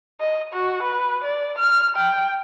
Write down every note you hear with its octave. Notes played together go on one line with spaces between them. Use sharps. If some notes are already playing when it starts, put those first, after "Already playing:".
D#5
F#4
B4
D5
F6
G5